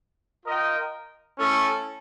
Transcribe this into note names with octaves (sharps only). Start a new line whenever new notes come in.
F4 A#4 D#5 G5
A3 C#4 E4 A4